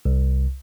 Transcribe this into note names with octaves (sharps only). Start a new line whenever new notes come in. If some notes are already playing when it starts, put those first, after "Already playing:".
C2